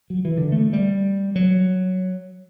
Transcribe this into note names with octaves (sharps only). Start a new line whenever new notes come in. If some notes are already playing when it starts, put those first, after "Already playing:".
F#3
E3
D3
A3
G3
F#3